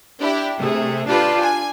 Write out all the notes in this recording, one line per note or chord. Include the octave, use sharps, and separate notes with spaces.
D4 E4 G4
C3 A3 G#4
D4 F4 G4 A4 B4
G#5